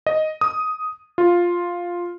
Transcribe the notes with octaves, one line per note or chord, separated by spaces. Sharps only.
D#5
D#6
F4